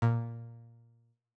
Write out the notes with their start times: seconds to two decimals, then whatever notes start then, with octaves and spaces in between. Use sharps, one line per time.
0.02 A#2